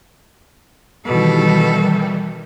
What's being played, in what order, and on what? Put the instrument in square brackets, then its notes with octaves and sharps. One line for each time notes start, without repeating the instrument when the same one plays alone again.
[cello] B2 A4 [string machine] D#3 E3 G3